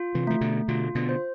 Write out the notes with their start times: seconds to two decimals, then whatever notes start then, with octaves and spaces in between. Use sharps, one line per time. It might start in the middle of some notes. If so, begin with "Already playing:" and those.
Already playing: F4
0.15 C3 E3
0.27 E3 A3
0.41 B2 D3
0.68 B2 D3 F4
0.95 B2 D3
1.09 C5